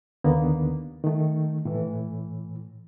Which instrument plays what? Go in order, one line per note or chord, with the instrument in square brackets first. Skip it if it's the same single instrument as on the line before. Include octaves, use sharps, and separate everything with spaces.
[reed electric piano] D#2 D3 A#3 B3
D#3 A3
A2 E3